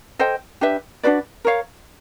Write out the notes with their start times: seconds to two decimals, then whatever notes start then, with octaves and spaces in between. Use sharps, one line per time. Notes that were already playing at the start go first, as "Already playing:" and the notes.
0.19 A4 C5 D#5 G5
0.61 D4 G4 B4 E5
1.03 D4 F#4 B4 D5
1.45 A#4 C#5 F5